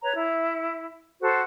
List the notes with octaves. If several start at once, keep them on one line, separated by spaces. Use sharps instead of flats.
B4 C#5 A#5
E4
F#4 A4 C5